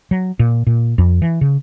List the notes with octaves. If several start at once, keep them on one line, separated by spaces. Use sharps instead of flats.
F#3
A#2
A#2
F2
E3
C#3